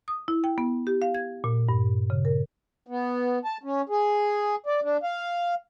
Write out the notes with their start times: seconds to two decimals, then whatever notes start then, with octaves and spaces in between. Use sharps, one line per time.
0.08 D#6
0.28 E4
0.44 G5
0.58 B3
0.87 G4
1.02 F5
1.14 G#6
1.44 A#2
1.69 G2
2.10 C#3
2.25 A#4
2.87 B3
3.45 A5
3.63 C#4
3.89 G#4
4.66 D5
4.83 D4
5.03 F5